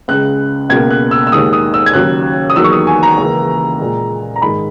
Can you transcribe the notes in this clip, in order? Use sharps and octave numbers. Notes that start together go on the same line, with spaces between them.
C#2 C#3 G#3 F#6
C#2 B2 A#3 G#6
F#6
E6
E6
D#2 D#3 G#3 D#6
D#6
E6
G#6
D#2 C#3 F#3 F#6
D#6
E2 D#3 F#3 A#3 E6
C#6
D#6
G#5
A#5
C#2 C#3 E3 A#3
A#2 G#3
A#5
G#2 D#3 G#3 B5